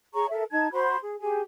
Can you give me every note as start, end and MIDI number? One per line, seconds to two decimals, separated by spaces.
0.14 0.26 68
0.14 0.26 73
0.14 0.26 82
0.14 0.26 85
0.30 0.43 69
0.30 0.43 70
0.30 0.43 76
0.51 0.71 63
0.51 0.71 81
0.51 0.71 92
0.72 0.97 66
0.72 0.97 72
0.72 0.97 83
0.72 0.97 84
1.01 1.15 68
1.20 1.40 67
1.20 1.40 68
1.20 1.40 80